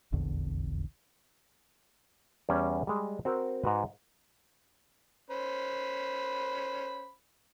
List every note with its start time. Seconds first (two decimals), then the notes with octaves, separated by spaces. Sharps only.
0.12 F1 A#1 E2 D3
2.49 E2 G3 C#4
2.87 G3 G#3
3.25 C4 F#4 A#4 C5
3.64 G#2 F#4 B4
5.30 C#4 C5 B5